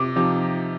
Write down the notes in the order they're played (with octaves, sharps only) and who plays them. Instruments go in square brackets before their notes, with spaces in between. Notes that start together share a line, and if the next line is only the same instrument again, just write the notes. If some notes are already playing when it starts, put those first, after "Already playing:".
Already playing: [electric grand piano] C3 [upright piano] D6
[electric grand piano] F3 C4 D#4 G4